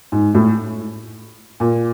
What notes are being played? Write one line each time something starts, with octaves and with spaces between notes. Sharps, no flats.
G#2
A2
A#2